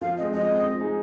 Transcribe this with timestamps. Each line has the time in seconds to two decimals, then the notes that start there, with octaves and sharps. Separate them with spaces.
0.01 F3 F5
0.17 C4 D#5
0.21 G#3
0.33 F3 D#5
0.48 G#3 C4
0.65 F3
0.80 G#3 D#4 G#4